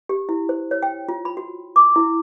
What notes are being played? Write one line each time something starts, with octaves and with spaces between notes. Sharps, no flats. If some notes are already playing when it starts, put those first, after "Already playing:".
G4
E4
C5
C#5
G5
F4
B5
F#4
D6
E4